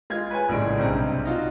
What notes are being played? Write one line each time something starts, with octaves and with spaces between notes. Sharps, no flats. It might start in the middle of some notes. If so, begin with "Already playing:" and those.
G#3 F4 G#6
B4 C#5 G#5
A#1 A2 C#3 G#3 D7
B1 G2 C3 C4
D#4 F4 F#4